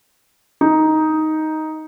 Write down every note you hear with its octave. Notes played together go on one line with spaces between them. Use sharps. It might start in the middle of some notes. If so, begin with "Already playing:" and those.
D#4